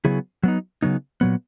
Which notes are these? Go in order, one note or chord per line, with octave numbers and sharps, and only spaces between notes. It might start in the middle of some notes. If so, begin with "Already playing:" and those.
C#3 F#3 B3 E4 G#4
F#3 B3 D#4
C#3 F#3 B3 D#4
A#2 F#3 B3